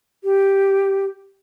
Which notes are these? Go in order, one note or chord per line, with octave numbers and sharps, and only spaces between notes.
G4